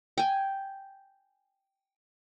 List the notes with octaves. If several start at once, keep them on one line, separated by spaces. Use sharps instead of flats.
G5 G#5